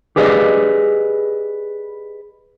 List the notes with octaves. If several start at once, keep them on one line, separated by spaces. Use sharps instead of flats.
G4 G#4 B4 D5 D#5